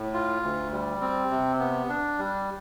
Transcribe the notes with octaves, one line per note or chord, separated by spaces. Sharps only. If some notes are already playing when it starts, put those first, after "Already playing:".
Already playing: A2
F4
D2
G3
C4
C3
B3
D4
G3